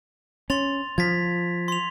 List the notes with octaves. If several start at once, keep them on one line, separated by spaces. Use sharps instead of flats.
C#4 C6 A6 F7
F3 G#6 A6 B6
C6 F7